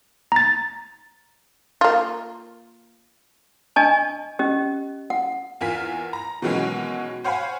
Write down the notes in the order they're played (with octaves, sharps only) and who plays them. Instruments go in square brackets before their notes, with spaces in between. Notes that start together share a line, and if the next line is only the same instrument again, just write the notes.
[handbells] A#5 A6
[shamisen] A#3 F4
[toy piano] D4 D#5 G#5 A5 C#6
C#4 G4 D#5
F#5
[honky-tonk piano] E2 F4 A#4 G#5 B6
A#5
B2 D#3 E3 F#3 G#3 C#4
C5 C#5 F5 F#5 G#5 B5